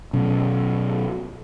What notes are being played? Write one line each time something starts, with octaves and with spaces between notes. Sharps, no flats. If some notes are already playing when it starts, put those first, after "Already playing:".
B2 F#3 C#4